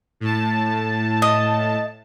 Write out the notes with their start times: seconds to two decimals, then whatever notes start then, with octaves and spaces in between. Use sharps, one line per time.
0.20 A2 A5
1.22 D#5